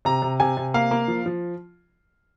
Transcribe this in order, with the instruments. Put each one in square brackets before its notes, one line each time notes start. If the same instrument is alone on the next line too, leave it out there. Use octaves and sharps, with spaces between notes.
[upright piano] C3 A#5
C3
C3 G#5
C3
A#3 F5
A#3
F3
F3